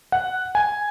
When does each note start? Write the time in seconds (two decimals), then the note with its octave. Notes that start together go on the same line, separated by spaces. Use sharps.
0.12 F#5
0.55 G#5